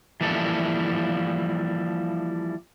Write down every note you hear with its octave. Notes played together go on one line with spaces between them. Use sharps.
E3 F3 G3 A#3 E4 A4